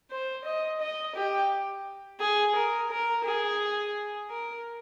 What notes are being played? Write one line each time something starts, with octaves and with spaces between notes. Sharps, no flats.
C5
D#5
D#5
G4
G#4
A#4
A#4
G#4
A#4